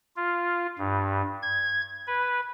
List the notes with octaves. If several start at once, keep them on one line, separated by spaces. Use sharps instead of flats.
F4
G2
G#6
B4